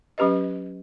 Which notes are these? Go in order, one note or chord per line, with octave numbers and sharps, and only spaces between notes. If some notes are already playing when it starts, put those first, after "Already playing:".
F#3 C#4 G4 B4 D#5